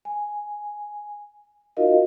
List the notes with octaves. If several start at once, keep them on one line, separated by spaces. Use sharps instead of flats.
G#5
D#4 F4 F#4 A#4 D#5 F5